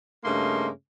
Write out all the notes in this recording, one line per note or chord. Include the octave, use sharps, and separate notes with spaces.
G2 C#3 A3 A#3 D#4 C6